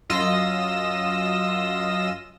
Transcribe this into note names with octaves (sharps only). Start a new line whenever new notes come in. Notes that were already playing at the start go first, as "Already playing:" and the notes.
F#2 F4 D#5 E6 A#6